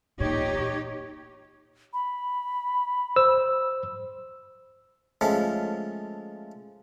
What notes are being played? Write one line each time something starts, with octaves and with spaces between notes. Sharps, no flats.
E2 A#2 D#4 G4 C#5
B5
C5 E6
F3 G#3 A3 C#4